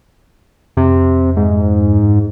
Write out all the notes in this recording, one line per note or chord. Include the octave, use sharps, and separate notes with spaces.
F2 C3
G#2